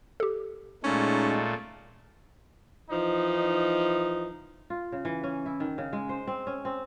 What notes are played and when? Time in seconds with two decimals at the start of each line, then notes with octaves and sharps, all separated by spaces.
0.20 G4 A4
0.84 A#2 G#3 A3 C#4 D#4
2.90 E3 F3 D#4
4.70 F4
4.92 C#3
5.05 E3
5.24 C#4
5.46 E4
5.60 D#3
5.78 C#3
5.93 G#3
6.09 C5
6.27 C4
6.47 C#4
6.65 C4